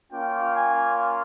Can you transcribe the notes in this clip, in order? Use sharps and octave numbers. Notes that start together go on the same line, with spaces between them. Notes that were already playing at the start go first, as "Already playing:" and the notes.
A#3 C#4 F4 G5
G#5